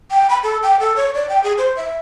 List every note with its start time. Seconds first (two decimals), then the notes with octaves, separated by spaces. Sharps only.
0.11 G5
0.30 B5
0.43 A4
0.63 G5
0.80 A4
0.96 C#5
1.15 D5
1.29 G5
1.43 G#4
1.58 C5
1.76 E5